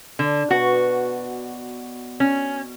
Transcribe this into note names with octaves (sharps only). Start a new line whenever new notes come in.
D3
B2 F#4 C#5
D5
C#4